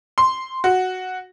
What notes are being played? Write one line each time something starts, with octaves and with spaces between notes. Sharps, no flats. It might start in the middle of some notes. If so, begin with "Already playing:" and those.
C6
F#4